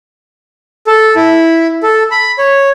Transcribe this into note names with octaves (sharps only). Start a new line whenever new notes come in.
A4
E4
A4
B5
C#5